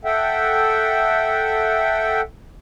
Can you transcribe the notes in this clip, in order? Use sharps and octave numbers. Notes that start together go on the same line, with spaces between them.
A4 E5 F#5 G5